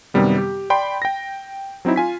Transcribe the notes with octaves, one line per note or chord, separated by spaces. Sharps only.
F#2 C3 D#3 G3 B3
G4
D5 G5 B5 C6
G5 A#6
F#3 C4 D#4 E4
F4 G#5 B6